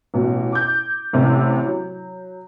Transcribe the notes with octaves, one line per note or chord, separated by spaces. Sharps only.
A1 B2
D6 G6
A1 C3 A3 E4
F#3